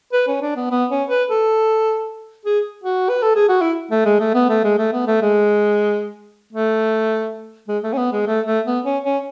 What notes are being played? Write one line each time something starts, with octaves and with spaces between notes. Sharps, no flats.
B4
C#4
D4
B3
B3
C#4
B4
A4
G#4
F#4
B4
A4
G#4
F#4
E4
A3
G#3
A3
B3
A3
G#3
A3
B3
A3
G#3
A3
G#3
A3
C#4
B3
G#3
A3
A3
B3
C#4
C#4